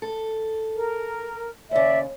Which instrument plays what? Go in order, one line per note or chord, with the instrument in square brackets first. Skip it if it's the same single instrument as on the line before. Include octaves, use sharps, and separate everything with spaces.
[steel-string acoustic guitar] A4
[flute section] A#4
[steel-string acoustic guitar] D#2 C#3 [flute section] D5 E5